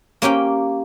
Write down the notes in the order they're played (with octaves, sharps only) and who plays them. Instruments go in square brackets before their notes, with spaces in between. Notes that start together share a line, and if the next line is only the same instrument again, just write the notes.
[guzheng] A#3 C#4 G4 G5